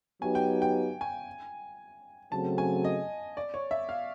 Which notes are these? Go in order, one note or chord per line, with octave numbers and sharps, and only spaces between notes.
F#3 B3 D#4 G4 G#5
G5
G5
G#5
C#3 F#3 A3 C4 A5
G#5
D#5
D5
C#5
E5
F5